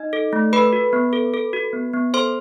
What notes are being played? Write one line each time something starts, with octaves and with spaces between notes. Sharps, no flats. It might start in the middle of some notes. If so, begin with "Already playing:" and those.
Already playing: D#4 D#5
A4
A3
A4 B4 B5
F#4
B3
A4
A4
F#4
B3
B3
A4 C5 C6